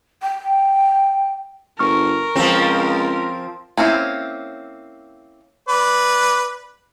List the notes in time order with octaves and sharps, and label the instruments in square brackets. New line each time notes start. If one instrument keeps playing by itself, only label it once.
[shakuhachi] G5
[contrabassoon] G1 [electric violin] A#4 [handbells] C#6 F6
[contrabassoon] C#2 [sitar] F3 C4
[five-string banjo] A#3 C4 C#4 E4
[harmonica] B4 D5